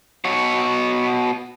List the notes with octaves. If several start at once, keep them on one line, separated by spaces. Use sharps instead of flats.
B2 C#5